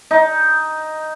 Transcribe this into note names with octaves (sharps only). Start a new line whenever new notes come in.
D#4